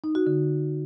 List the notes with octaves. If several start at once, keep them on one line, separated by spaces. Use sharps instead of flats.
D#4
F#4
D3